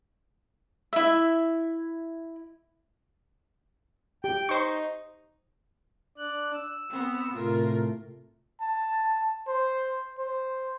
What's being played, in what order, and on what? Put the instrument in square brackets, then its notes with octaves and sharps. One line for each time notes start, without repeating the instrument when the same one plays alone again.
[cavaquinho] E4 E5
[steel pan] G4 [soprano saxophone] G5
[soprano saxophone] D#4 [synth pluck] C5 C#6
[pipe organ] D4 D5 F#6
E6
[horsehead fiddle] B3 C4
[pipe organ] A2 C3 A3 [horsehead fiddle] F4 A#4
[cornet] A5
C5
C5